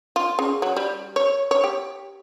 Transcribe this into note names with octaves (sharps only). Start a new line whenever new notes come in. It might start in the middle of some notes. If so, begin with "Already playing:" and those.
F4
C#3
F#3
G3
C#5
C#5
G4